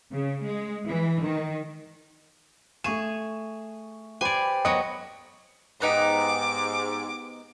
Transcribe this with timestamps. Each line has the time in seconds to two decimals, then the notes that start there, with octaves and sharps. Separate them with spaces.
0.12 C#3
0.43 G#3
0.86 E3
1.22 D#3
2.84 A3 G#4 C#6 E7
4.21 G4 B4 C5 D5 G#5
4.65 F#3 B3 D#5 D#6 C#7
5.82 G#2 B3 D#4 G4 D6